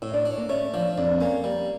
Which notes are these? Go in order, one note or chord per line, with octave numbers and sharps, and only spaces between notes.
A2 E4 E5
D4 D5
D4
C#5
A#3 A#4
A3 C#4 C#5
F3 D4 D5
F2 D4 D5
A#3 C#4 C#5
G3 A#3 A#4